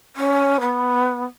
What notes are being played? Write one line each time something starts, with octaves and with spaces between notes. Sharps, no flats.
C#4
B3